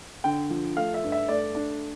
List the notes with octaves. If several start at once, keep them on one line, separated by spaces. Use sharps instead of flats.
D3 G5
F3
A3 F5
E5
G2
E5
A3 D5
D4